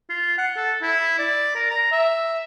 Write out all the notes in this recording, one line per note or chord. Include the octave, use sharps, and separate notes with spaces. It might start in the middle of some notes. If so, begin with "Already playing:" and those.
F4
F#5
A4
E4
D5
A#4
A#5
E5